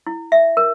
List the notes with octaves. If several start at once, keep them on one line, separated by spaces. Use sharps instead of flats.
E4
E5
A#4